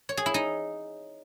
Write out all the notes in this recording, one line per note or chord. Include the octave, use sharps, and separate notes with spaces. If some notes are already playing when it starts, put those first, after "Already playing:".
C#5
G#4
E4
D#4